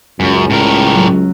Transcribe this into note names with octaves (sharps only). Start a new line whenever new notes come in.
C#2 F#2
A2 A#4
F#3 A3 C#4